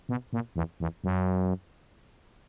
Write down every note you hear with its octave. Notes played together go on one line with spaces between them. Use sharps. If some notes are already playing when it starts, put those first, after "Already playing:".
B2
A#2
E2
E2
F#2